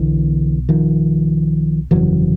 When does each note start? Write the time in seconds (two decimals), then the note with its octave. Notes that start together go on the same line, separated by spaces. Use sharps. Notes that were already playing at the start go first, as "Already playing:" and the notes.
Already playing: B1 B2 D3 E3
0.69 D#3 F3
1.91 G1 F2 C#3 E3 F#3